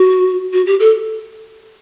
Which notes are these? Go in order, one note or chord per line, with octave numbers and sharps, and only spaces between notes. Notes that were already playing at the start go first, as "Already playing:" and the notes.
Already playing: F#4
F#4
G4
A4